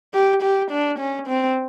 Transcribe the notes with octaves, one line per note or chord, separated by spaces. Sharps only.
G4
G4
D4
C#4
C4